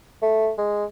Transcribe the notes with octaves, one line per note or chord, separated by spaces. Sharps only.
A3
G#3